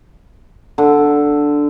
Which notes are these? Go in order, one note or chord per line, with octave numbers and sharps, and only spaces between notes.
D3